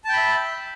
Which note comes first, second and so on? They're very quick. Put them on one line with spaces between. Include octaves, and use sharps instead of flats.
A5 G5 B5 E5